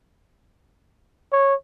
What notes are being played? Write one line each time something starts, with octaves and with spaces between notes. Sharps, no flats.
C#5